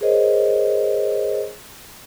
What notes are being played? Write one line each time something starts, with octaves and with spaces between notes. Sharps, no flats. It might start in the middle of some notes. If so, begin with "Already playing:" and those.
G#4 A#4 C5 C#5 D#5